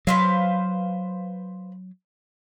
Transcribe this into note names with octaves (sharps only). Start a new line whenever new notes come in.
F#3 B4 C5 F5